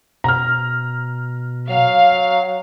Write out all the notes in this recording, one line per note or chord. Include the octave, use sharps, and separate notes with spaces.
B2 A#5 F6
F#3 F5